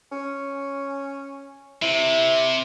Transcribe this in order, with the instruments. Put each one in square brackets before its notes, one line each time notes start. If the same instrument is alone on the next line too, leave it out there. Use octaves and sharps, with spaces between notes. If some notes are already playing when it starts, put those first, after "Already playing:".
[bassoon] C#4
[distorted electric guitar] C3 [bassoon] E4